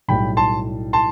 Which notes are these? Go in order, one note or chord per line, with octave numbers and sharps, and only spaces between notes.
B1 A2 G3 G5 B5
A5 C6
A5 C6